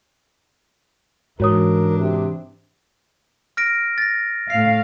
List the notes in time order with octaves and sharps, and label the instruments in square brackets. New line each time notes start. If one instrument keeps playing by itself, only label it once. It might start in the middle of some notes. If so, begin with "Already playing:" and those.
[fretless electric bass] G#2 [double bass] E3 D4 [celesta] F#4 C#5 D#6 [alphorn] A#4
[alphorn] C3
[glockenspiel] F6 A#6 D7
A6 A#6
[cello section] A2 F5 [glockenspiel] C7